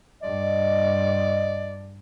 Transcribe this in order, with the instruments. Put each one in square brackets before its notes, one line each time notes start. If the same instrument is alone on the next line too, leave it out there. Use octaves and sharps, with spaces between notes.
[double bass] G2 [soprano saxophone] D5 [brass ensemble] D#5